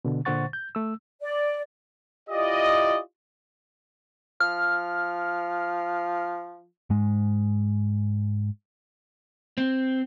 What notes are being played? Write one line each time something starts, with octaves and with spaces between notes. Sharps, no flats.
B2 D3
A#2 D3 C5 F#5 C#6 A6
G6
A3 E6
D5
E4 F4 G4 D5 D#5
F3 F6
G#2 G#3
C4